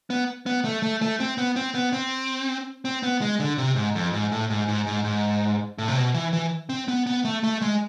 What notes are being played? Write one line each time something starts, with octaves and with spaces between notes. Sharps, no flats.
B3
B3
A3
A3
A3
C4
B3
C4
B3
C4
C4
B3
G#3
D3
C3
G#2
F2
G#2
A2
G#2
G#2
G#2
G#2
A2
C3
B2
E3
E3
C4
B3
B3
A3
A3
G#3